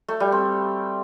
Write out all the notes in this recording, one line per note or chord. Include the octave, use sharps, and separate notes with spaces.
A3
G3
C4